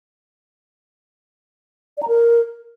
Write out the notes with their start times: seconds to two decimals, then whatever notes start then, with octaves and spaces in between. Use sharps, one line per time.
1.97 D5
2.03 A#5
2.08 A#4